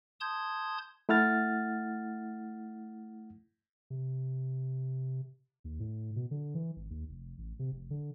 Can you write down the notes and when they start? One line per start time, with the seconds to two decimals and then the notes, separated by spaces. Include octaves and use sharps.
0.20 A5 C6 D#6 G6 G#6
1.09 A3 E4 F#5 F6 A6
3.90 C3
5.64 D#2
5.80 A2
6.16 B2
6.31 D3
6.55 E3
6.76 G#1
6.90 D#2
7.09 F1
7.38 A1
7.59 C3
7.72 F1
7.90 D3